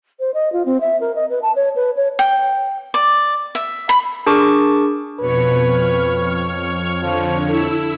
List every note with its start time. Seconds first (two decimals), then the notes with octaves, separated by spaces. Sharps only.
0.20 C5
0.34 D#5
0.53 F4
0.65 C4
0.81 E5
1.00 A#4
1.15 D#5
1.30 B4
1.42 A5
1.56 C#5
1.76 B4
1.96 C#5
2.19 G5
2.94 D5
3.55 E5
3.89 B5
4.27 D4 G#4 A#4 A5 C#6 D6
5.20 F2 B2 B4 C#5 C#7
5.68 C#6 F6
7.02 D3 F3
7.49 E4 A4 E6